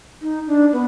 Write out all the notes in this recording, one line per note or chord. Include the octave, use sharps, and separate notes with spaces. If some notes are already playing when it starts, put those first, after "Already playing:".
D#4
D4
B3